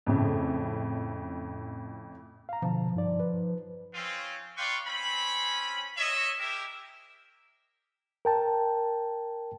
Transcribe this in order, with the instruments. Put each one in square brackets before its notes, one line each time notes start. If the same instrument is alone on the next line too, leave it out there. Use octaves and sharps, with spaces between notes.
[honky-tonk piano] F2 A2 C#3
[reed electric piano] F5 A#5
[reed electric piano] B2 D3 A5 [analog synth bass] F3
[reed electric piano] G2 D#4 D5
B4
[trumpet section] C4 C#4 F4
B4 D5 F5 G5 C6 C#6
C4 C#4 B5
C#5 D#5 E5
G#3 G4 A#4 E5
[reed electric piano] A#4 G5 A5